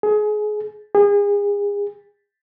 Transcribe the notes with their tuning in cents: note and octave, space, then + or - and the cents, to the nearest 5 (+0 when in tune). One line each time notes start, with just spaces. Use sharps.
G#4 +25
G#4 -35